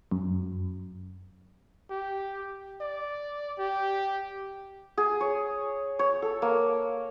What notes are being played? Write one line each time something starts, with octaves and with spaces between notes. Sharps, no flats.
F#2
G4
D5
G4
G#4
C#5
C#5
A4
A#3